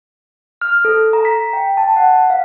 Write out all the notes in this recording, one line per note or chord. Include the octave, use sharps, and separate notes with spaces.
F6
A4
A#5
B6
G5
A5
F#5
F5